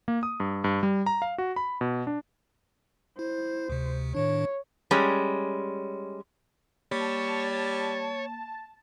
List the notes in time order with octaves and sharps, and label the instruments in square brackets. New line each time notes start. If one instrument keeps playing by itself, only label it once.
[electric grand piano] A#3
D#6
G2
G2
G3
A#5
F5
F#4
B5
B2
D4
[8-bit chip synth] E4 [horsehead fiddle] C5
[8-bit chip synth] D2 C3
[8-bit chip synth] A2 D#3 D4 [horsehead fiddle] C#5
[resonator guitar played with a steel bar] G3 G#3 C#4
[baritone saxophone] G3 [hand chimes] A#3 [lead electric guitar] C#5 [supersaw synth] A5